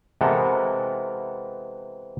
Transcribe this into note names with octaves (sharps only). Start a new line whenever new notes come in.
C3 E3 G#3 B3 A4 A#4